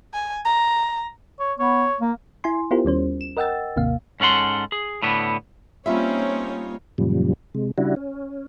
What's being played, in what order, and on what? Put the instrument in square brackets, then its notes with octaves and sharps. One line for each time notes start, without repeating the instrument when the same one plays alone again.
[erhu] G#5
A#5
[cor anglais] C#5
[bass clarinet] B3 [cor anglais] C#5
[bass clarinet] A#3
[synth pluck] E4 G#5 C6
B3 E4 F4 G4 A#4 C5
D#2 G3 C#4 C5
E7
A#4 D#5 F#5 G5 E6 A6
G#1 D#2 C3 A#3 F5
[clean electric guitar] G#2 C#4 A4 F#5 C6
G#4
A2 D3 B3
[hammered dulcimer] G3 F4 [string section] A#3 D#4 C#5 [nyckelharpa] C4 C#4 [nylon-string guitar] E5
[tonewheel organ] F#2 A#2 C#3 F3 G3
C3 G#3
C#3 G3 D4 E4 F#4
C#4